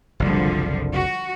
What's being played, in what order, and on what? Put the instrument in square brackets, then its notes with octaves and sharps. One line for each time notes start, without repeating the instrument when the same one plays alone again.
[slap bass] F#1 C2 [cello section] D3 F3 G3
[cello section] F#4